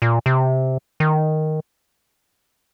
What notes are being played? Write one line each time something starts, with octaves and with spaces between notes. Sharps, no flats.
A#2
C3
D#3